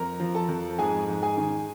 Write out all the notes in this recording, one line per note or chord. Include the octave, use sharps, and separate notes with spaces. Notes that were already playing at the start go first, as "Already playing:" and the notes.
Already playing: F2 A#4 A#5
F3
A4 A5
F2
G#2 G#4 G#5
G#2
G#4 G#5
D#3